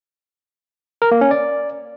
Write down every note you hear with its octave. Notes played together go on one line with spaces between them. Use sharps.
A#4
A#3
C#4
D5